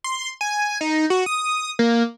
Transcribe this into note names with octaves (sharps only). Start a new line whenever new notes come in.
C6
G#5
D#4
F#4
D#6
A#3